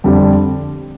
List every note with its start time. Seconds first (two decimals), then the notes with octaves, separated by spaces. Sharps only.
0.04 F2 D3 G3